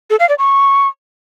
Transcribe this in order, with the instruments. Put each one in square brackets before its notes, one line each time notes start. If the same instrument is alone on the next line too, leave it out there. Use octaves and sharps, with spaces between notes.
[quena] A4
F5
D5
C#6